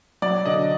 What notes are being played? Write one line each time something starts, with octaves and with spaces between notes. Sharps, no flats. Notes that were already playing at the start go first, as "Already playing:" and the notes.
F#3 D5
D3 D#5